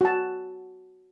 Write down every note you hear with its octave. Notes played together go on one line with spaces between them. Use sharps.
F#4 A5